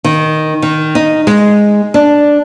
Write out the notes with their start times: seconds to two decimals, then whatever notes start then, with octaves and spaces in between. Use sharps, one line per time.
0.04 D#3
0.62 D#3
0.95 D#4
1.27 G#3
1.94 D4